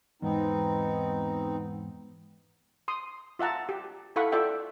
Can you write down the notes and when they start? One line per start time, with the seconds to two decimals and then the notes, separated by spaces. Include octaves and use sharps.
0.22 E2 G#2 B3 C4 D#4
2.88 C6 D#6
3.39 F4 E5 F#5 A5 A#5
3.69 G4
4.16 E4 A4 F5 F#5 B5 C#6
4.32 F4 A4 D5 E5 G5